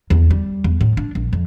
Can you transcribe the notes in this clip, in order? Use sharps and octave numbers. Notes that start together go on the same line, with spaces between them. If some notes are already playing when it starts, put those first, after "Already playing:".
E2
G3
E2
A2
D4
A#1
F2